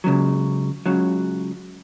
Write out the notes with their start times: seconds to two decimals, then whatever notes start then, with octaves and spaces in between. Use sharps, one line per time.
0.04 C#2 C#3 F#3
0.86 C#2 C#3 F#3